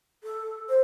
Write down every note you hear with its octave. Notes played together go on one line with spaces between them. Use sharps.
A4
C5